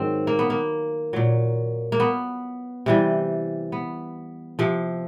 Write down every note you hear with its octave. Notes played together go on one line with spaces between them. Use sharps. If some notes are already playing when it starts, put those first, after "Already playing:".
Already playing: G#2 D#3 F#3 C4
A#3
B3
A#3
A#2 F#3
A#3
B3
C3 E3 G3
B3
C3 F3